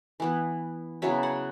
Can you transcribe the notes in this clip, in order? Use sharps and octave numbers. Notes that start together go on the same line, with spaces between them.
E3 B3 E4
C#3 F#3 B3 E4 E5
F#5